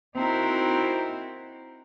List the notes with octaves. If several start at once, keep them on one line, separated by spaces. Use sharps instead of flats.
C4 D#4 E4 F#4 A#4 C5